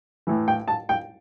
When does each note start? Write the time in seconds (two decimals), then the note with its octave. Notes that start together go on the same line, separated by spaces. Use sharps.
0.27 A2 E3
0.48 G5
0.68 A5
0.89 G5